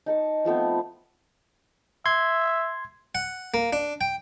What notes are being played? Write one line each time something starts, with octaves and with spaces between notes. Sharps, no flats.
D#4 A5 C#6
F3 A3 B3 C4
E5 C6 G#6
F#5
A#3
D4
G5